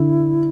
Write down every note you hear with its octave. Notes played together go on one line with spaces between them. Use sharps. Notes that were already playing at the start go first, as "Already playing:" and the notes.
Already playing: D3 E4